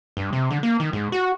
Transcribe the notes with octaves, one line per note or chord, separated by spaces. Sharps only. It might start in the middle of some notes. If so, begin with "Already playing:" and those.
G2
C3
D3
A#3
D#3
G#2
F#4